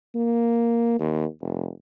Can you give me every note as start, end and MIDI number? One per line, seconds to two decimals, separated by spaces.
0.15 0.99 58
0.99 1.25 39
1.41 1.69 29